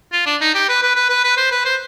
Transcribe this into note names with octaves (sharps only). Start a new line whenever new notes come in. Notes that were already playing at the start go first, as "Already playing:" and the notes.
F4
D4
D#4
G4
B4
B4
B4
B4
B4
C5
B4
C5